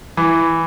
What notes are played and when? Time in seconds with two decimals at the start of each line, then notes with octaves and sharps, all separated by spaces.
0.17 E3